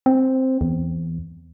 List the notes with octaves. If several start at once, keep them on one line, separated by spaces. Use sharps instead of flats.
C4
E2